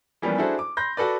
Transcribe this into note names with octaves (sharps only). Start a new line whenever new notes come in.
E3 F3 G3 A#3 B3 C#4
D4 E4 F#4 G#4 A4 C5
D6
B5 C6 G6 A#6
F#4 A4 B4 D5